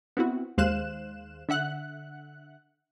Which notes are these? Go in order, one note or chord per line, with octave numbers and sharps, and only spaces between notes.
B3 C4 E4 F#4
D#2 G#3 C5 F5 F#6 E7
D3 E5 F#5 F#6